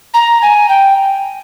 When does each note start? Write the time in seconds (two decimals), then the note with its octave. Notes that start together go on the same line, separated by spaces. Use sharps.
0.14 A#5
0.42 G#5
0.69 G5